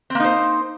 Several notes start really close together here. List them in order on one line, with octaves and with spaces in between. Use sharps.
C4 A#3 D#4 C5